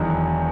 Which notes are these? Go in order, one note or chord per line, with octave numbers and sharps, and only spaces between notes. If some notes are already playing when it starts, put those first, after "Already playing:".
Already playing: E1 E2 D#3 F#3